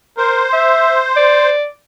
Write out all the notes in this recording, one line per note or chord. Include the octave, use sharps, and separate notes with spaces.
A#4 C5
E5
D5